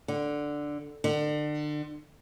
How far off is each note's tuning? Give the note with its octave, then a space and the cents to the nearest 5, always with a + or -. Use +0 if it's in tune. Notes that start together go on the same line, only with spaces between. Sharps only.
D3 +0
D3 +35